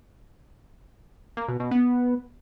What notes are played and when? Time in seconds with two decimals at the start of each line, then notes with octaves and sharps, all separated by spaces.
1.37 A#3
1.48 B2
1.60 B2
1.71 B3